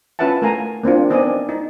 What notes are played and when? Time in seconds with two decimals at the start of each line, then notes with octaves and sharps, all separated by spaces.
0.19 C#4 F4 B4 E5 F#5 A5
0.42 A3 A#4 F5 G#5 A#5
0.83 A#3 C4 D4 F4
1.10 B3 C4 D#4 D5 D#5 G#5
1.49 D#4